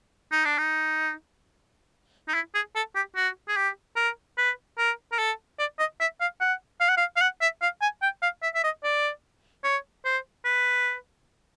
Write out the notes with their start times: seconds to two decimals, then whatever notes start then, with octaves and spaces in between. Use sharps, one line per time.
0.32 D#4
0.45 D4
0.58 D#4
2.28 D#4
2.34 E4
2.55 G#4
2.76 A4
2.96 G4
3.16 F#4
3.48 G#4
3.57 G4
3.96 A#4
4.38 B4
4.79 A#4
5.12 A#4
5.19 A4
5.59 D5
5.79 D#5
6.00 E5
6.21 F5
6.41 F#5
6.81 F5
6.89 F#5
6.97 F5
7.17 F5
7.22 F#5
7.42 E5
7.62 F5
7.82 G#5
8.02 G5
8.22 F5
8.42 E5
8.55 E5
8.64 D#5
8.84 D5
9.64 C#5
10.05 C5
10.45 B4